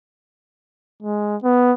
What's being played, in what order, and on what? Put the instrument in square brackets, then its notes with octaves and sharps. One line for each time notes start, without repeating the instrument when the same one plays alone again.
[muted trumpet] G#3
B3